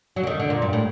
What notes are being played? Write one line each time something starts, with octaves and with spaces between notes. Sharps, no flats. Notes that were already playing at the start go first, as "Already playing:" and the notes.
F#3
D3
D#3
D3
A#2
G2
A2